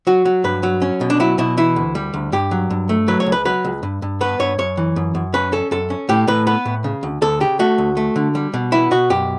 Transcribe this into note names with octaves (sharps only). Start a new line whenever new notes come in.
F#3 F#4
F#3
G2 B4
F#3
C#4
B2
D4
F#3 E4
B2 E4
E3 E4
D2
G3
D2
G2 G4
F#3
G2
A3
F#3 B4
C#5
C#2
B4
F#3 B4
C#2
G2
G2
B3 B4
G2 C#5
F#2 C#5
E3
F#2
F#2
C#4 B4
C#4 A4
F#2 A4
C#4
A2 G4
A2 B4
B3 B4
A2
C#3
D2
D2 A4
C#3 G4
A3 F#4
D2
A3
D3
G3
B2
B3 E4
B2 F#4
F#2 G4